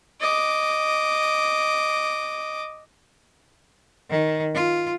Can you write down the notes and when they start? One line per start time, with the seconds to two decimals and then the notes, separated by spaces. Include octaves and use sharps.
0.21 D#5 D6
4.10 D#3
4.54 F4